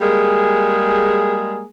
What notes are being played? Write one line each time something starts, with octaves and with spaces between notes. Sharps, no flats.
G3 G#3 A#3 G#4